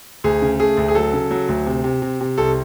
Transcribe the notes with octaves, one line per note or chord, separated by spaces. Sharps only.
D2 G#4
C#3
A3 G#4
D2
G#4
F#3 A4
C#3
F#3
D2
C3
C3
C3
C3
C2 A4